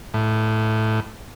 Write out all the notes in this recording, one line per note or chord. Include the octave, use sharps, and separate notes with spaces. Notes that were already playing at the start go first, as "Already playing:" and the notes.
A2